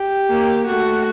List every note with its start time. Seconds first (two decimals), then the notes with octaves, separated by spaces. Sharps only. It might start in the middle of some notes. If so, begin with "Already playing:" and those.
Already playing: G4
0.30 A#3
0.67 A3 F#4